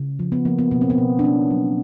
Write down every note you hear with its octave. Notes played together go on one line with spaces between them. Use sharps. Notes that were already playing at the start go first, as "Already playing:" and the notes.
Already playing: C#3
F3
B3
F3 A#3
B3
B2 A#3
C4
B3
B2
D4
A#3 C#4
F#3